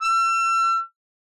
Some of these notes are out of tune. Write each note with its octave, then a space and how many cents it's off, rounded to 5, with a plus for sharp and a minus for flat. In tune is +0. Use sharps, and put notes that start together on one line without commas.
E6 +40